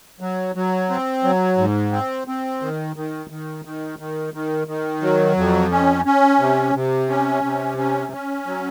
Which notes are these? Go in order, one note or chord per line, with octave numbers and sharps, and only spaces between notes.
F#3
F#3
C4
F#3
G#2
C4
C4
D#3
D#3
D#3
D#3
D#3
D#3
D#3
F#3
F2
C#4
C#4
C3
C3
C#4
C3
C#4
C#4
F#3